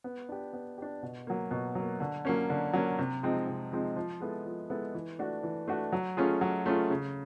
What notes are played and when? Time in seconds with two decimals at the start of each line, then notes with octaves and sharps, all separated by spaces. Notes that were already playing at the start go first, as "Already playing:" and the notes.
0.04 B3
0.29 D4 G4
0.53 B3
0.78 D4 G4
1.03 B2
1.27 F#3 A#3
1.51 B2
1.75 F#3 A#3
2.00 D3
2.25 F#3 A#3 C#4
2.50 D3
2.73 F#3 A#3 C#4
2.99 C3
3.23 F3 G#3 C4 D#4
3.47 C3
3.72 F3 G#3 C4 D#4
3.96 F3
4.20 G#3 B3 E4 A4
4.45 F3
4.70 G#3 B3 E4 A4
4.94 E3
5.19 A3 D4 F#4
5.43 E3
5.68 A3 D4 F#4
5.92 F#3
6.17 A3 C#4 F4 G#4
6.41 F#3
6.66 A3 C#4 F4 G#4
6.90 C#3